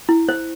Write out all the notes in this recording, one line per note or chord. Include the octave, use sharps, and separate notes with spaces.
E4
C5